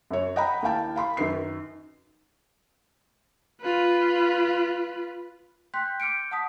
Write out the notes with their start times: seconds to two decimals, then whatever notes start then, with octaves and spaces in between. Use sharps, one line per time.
0.11 F#2 C#5
0.36 D#5 F#5 G5 A#5 B5
0.62 D#2 E4 F5 G5 A5
0.96 F5 B5 C6
1.17 F#2 D#3 B4 C7
3.62 F4 B4
5.74 G5 C6 F#6 G6 B6
6.00 D6 F6 G6 C#7 D7
6.31 F#5 A5 D#6 B6